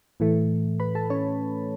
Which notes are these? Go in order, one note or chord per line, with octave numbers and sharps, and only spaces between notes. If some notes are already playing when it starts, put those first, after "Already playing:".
A2 E3 A3
B4 B5
A4 A5
C#4 C#5